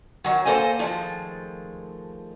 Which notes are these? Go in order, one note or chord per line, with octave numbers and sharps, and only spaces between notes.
D#3 F#3
A#3 A4 C5 D#5 G#5
D#3 F3 G#3 A3